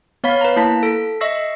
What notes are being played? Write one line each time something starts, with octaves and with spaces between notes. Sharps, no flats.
B3 C#5 F5 B5 B6
B4 A#5
A#3 E4 A5 B6
A4 B6
D#5 E5 C#6 E6 A#6 C7